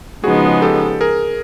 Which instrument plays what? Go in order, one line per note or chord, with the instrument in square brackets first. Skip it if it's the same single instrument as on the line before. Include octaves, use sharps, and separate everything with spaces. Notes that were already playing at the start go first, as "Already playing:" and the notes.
[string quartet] C#3 F3 G#3 B3 D#4 [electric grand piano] F#4 G#4
[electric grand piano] G4 A4
G#4 A#4